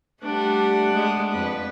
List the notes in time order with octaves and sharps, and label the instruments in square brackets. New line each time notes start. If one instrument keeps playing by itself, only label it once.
[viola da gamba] G3 A3 [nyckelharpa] D4 F#5
[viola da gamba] G#3 A3
F2 B4